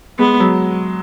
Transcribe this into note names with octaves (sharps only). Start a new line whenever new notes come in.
G#3 B3
F#3